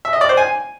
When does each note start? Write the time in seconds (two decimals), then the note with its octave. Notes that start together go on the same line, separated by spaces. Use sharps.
0.05 E5
0.13 D#5
0.21 D5
0.29 C5
0.37 G#5